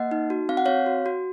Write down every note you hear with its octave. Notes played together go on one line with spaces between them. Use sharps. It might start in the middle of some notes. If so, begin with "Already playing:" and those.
Already playing: A#3 D#5 F#5
D#4
F#4
C4 F5
F#5
C4 C#5 F5
F#4
F#4